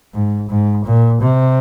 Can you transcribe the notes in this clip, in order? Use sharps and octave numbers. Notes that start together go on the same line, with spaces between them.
G#2
G#2
A#2
C3